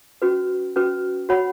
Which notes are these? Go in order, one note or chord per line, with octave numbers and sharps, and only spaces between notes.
C#4 F#4 B4
C#4 F#4 B4
F#4 C#5 F#5 B5